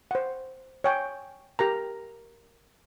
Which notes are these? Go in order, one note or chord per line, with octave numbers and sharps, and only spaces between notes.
C5 F#5
C#5 G5 G#5
G4 A#4 A#5